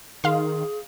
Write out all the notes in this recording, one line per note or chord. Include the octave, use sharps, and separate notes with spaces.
D#3 G#4 F5 C6